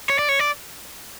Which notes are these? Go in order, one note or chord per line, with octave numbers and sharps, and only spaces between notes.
C#5
D5
C#5
D5